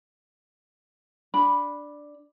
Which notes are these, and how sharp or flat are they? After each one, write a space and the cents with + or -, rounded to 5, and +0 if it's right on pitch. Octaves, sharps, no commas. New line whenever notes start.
D4 +0 B5 -5